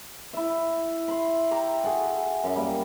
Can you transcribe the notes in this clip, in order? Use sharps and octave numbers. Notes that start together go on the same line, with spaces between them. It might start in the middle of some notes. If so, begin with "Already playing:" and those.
E4 E5
B5 C6
E5 G5 A#5 D6
F#4 G#4 A4 F#5
F#2
G3 A#3